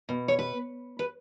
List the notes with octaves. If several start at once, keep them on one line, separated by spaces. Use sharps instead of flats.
B2
C#5
B4
B4